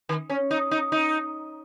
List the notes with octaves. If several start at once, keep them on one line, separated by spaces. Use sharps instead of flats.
D#3
C#4
D#4
D#4
D#4